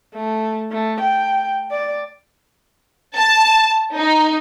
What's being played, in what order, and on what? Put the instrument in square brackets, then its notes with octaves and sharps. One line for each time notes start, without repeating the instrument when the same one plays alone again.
[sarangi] A3
A3
G5
D5
[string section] A5
D#4